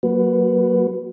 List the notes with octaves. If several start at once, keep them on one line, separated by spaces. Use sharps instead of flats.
F#3 A#3 F#4 B4